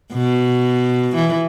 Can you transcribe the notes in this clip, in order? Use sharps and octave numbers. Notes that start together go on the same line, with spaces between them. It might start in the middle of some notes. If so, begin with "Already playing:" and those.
B2
E3